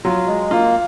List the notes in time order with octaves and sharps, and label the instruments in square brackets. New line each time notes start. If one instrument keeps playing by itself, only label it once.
[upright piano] F#3 [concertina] F4
[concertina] G#3
[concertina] A#3 [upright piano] F4